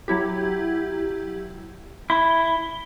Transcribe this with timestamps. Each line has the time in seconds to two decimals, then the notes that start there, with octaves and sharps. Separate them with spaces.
0.08 F#3 E4 G4
2.10 E4 G7